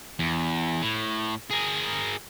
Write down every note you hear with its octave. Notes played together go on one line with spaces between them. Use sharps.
E2
A2
G#4 A#4